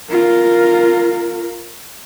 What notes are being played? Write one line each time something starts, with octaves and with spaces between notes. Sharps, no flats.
F4 A#4